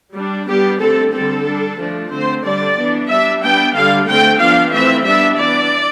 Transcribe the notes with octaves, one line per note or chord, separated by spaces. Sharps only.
G3 D4
G3 B3 D4 G4
D3 A3 C4 A4
D3 G3 C4 A4
G3 D4
F3 A3 D4
D3 A3 C4 C5
D3 G3 D4 D5
E3 B3 D4
G3 D4 E5
G3 B3 D4 G5
D3 G3 D4 F5
D3 A3 C4 G5
F3 B3 D4 F5
E3 A3 C4 E5
G3 B3 D4 E5
E3 B3 D4 D5